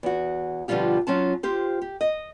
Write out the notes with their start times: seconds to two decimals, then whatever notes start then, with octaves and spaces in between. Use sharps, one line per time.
0.03 E2 F#4
0.68 B2 D3 F3 G3 F4 G4
1.07 F#3 C#4 F4 A5
1.43 F4 G4 C5
1.81 G4
2.01 D#5